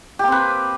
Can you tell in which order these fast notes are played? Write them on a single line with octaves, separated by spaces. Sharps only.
G4 A#3 C4 B4